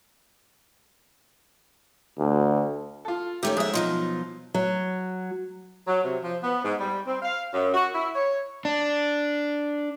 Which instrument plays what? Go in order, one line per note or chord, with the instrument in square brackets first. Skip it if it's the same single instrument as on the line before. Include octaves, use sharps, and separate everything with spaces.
[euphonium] D2
[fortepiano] F4 A4
[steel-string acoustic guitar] D#3 A3 C#4 [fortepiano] G4 E5
[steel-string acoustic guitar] F2 E5 [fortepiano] G#2 G#4 D#6
[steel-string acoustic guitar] B2 F3 F#3 [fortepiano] D#4 F4
[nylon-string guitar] F#3
[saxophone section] F#3
C3
F3
B3
G#2
G3
C4
F5
F#2
F#4
E4
C#5
[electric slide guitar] D4